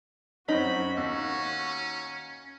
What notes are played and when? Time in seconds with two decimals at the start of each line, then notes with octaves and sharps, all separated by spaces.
0.48 F#2 C4 C#4 D#4 F#4 B5
0.97 D#2 C#4